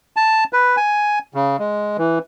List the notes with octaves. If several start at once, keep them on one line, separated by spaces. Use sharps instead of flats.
A5
B4
G#5
C#3
G#3
E3